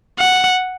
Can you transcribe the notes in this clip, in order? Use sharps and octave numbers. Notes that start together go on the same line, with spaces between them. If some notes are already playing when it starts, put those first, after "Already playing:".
F#5